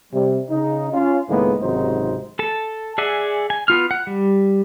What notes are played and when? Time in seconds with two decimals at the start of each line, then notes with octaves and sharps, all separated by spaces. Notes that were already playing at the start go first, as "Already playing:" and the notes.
0.13 C3 G3
0.50 C#3 D#4
0.93 C#4 F4
1.29 C#2 A2 D#3 G#3 A#3 B3
1.62 G#1 C#2 C3 F#3 D#4 C5
2.39 A4 A5
2.98 G#4 D5 E5 F#5 G#5
3.50 G#5
3.68 B3 F4 F6
3.91 F#5
4.07 G3